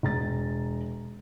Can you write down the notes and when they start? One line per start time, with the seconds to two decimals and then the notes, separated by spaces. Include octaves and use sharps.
0.03 E1 A#5 A6